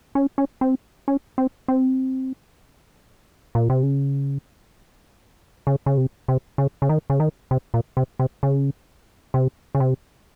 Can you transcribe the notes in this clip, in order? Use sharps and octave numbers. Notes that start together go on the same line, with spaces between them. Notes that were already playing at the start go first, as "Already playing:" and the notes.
C#4
C#4
C4
C#4
C4
C4
A#2
C3
C#3
C#3
C#3
C3
C3
C#3
C#3
D#3
C#3
D#3
C3
A#2
C3
C3
C#3
C3
C#3
C3